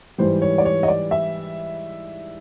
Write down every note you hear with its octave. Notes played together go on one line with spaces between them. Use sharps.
G#2 E3 G3 C5
C#5
D5
C#5
D#5
D5
E5